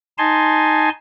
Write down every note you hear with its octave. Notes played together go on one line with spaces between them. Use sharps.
D#4 G#5 A5 C6